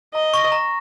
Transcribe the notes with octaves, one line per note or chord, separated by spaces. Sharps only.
D#5 A#5
C#6 A#6
A#5